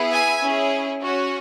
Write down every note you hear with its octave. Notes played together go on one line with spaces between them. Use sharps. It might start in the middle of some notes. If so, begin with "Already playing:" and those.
Already playing: B3 E4 G#4
E5 G#5
C#4 E4 G#4
C#4 F#4